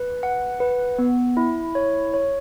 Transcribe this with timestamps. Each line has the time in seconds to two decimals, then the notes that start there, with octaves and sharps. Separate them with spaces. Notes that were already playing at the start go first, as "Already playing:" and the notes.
Already playing: B4
0.23 F#5
0.60 B4
0.98 B3
1.37 E4
1.75 C#5
2.14 C#5